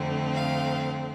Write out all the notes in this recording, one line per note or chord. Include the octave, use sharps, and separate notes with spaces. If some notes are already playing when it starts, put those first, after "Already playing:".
Already playing: F2 D3 A3 C4
F5